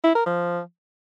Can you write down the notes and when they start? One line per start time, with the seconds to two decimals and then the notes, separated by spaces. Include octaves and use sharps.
0.04 E4
0.15 A#4
0.26 F3